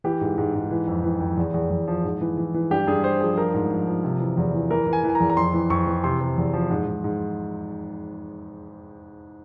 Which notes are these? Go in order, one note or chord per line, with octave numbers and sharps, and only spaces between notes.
E3 G4
G#2
G#2
G#2
E3
F2
E3
F2
E2
E2
E2
F3
G#2
E3
E3
E3
G2 G4
G2 G#4
G2 C5
F3 G#4
F3 A#4
G#2
F3
F3
C3
E3
E2
E3
E3 A#4
E3
G#5
E3
G#5
A#5
E2
A#5
F2 C6
E3
F2 C#6
E3
C3 C6
C3
E2
F3
G#2
G#2
G#2